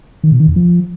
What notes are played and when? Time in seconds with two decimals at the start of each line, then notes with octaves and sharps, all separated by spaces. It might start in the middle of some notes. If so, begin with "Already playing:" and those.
0.24 D#3
0.32 B2
0.40 D#3
0.48 E2
0.56 F3